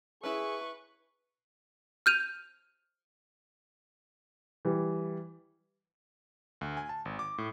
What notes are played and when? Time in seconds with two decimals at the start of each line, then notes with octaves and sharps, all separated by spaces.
0.23 C#4 E4 G#4 B4 C#6
2.06 F6 G6 D#7 F7
4.65 E3 G3
6.61 D2
6.77 G#5
6.89 A5
7.05 G#1
7.19 D6
7.38 A2